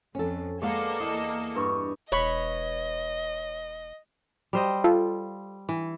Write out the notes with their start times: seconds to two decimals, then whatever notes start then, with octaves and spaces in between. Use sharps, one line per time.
0.15 F2 C#4 A4
0.62 G#3 A#3 B3 A4 D5 F5
1.00 E2 D#5
1.56 G2 C#6
2.12 E1 B4 C#5 D#5 B5 C#6
4.53 G3 C5 D#5
4.84 F4 A4
5.69 E3